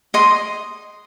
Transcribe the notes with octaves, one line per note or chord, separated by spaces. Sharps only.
D#5 C6